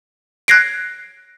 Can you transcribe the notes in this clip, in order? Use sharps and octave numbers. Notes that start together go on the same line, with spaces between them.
F#6 G#6 A#6 C7 D7